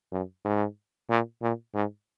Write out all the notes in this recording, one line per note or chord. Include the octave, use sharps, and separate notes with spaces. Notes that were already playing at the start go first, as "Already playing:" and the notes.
F#2
G#2
A#2
A#2
G#2